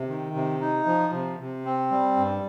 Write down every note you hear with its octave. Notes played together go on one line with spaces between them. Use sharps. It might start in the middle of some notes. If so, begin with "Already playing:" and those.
Already playing: C3
D#3
C3
D#4
F3
C3
C3
C4
G3
G2